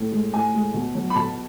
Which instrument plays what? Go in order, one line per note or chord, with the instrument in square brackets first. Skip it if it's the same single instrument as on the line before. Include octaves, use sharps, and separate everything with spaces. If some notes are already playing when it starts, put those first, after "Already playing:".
Already playing: [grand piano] A2
G#3
A2 G#5
G#3
B2
F#3
B5
B2 A5